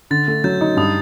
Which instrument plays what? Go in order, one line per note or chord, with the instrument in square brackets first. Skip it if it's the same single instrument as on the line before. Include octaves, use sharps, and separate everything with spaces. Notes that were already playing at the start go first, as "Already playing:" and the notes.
[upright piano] D3 [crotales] A6
[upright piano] A3
[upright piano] F#3 [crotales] G6
[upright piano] D#4
[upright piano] G2 [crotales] D#6